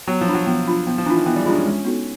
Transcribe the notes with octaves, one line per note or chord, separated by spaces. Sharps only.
F#3 B3
F3
D4 F4
F#3
F3 B3
D4 F4
F3 B3
F3
E3 D4 F4
D#3
E3 B3
G3
G#3 D4 F4
C#4
G#3
B3 D#4 F#4 A4